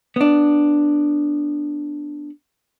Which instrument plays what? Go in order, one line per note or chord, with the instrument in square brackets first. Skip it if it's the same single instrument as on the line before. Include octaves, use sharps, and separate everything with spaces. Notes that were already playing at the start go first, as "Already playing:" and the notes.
[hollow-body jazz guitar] B3 D4